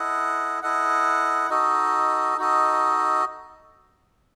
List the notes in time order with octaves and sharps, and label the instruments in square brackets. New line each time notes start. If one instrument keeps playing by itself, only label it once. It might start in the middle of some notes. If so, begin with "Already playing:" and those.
Already playing: [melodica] E4 A4 D#5 F#5
E4 A4 D#5 F#5
D#4 F#4 A4 D#5
D#4 F#4 A4 D#5